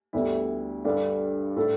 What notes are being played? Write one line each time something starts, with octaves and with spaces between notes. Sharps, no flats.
D2 D3 G3 B3 E4
G2 D3 G3 D4 A4
A2 A3 D4 A4